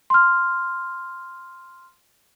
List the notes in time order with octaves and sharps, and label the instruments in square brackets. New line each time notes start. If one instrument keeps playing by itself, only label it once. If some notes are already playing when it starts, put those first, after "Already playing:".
[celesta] C6 F6